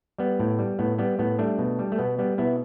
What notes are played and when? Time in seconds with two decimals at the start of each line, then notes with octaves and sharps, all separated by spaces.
0.18 G3 B3
0.39 A2
0.59 G3
0.79 A2 B3
0.99 G3 B3
1.19 A2 B3
1.39 G3 A3 D4
1.59 B2
1.79 G3
1.92 A3
1.98 B2 B3
2.19 G3 B3
2.38 B2 B3 E4